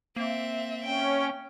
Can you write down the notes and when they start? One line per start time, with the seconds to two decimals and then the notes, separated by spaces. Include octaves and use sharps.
0.16 A#3 C4 E5
0.84 C#4 G5